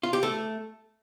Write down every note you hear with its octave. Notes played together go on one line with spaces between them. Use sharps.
F4
G4
A3